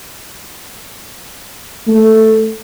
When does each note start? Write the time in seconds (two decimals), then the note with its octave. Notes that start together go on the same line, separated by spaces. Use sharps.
1.87 A3